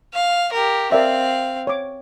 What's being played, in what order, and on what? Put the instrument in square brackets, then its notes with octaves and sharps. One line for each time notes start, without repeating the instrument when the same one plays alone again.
[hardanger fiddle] F5
G4 A#4
[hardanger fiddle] C4 F5 [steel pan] A#4 D5 E5
[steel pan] C#5 D6